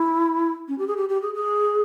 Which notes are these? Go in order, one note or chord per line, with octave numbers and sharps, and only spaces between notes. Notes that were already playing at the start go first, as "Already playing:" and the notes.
Already playing: E4
C#4
G4
G#4
G4
G4
G#4
G#4